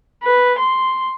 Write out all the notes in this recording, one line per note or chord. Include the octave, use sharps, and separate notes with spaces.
B4
C6